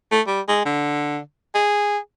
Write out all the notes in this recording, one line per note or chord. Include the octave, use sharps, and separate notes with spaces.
A3
G3
G#3
D3
G#4